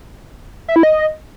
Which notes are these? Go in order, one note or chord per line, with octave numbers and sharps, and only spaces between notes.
E5
E4
D#5